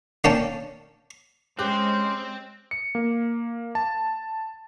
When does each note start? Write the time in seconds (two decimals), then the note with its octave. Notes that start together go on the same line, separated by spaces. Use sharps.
0.24 A#3 C#4 D4 G5 A5
1.59 G#3 C4 C#4 G4 C5 D6 F#6
2.71 C#7
2.95 A#3
3.75 A5